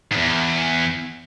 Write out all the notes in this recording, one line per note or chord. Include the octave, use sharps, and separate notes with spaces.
E2 G#2